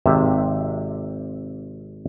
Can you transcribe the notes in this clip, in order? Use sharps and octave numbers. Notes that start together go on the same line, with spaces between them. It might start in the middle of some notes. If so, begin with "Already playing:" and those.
G#1 C3 E5